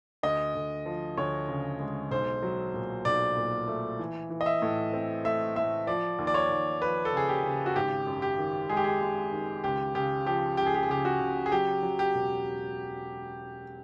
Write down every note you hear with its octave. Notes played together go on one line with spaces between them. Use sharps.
D2 D#5
D2
F3
D2 C#5
C#3
G#3
B1 C5
F#3
A#2
B1 D5
A#2
A3
E3
E3
D#5
E5
A2
C4
A3 E5
A2 E5
F3 D5
D#2
D5
C#5
D#2
F3 B4
A4
C#3 G#4
G4
C#3
F#4
G#1 G4
F#2
G4
D#3
G#3 G#4
G4
G#4
G#3
D#3
C#2 G4
C#3 G4
F3 G4
C#2 G4
G#4
G4
G#4
C#3 G4
F#4
C#3
G#4
F#3 G4
F#3
G4
E1